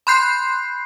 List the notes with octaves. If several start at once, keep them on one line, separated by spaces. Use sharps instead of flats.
B5 C6 F#6 G6 C7